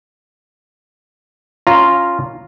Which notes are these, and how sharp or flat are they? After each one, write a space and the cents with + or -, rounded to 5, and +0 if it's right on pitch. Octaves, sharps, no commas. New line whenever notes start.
C#4 +0 F4 +0 A#5 +0